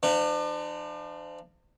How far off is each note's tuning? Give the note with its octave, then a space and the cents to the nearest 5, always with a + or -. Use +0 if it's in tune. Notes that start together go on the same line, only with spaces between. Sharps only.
F3 -30 D4 +35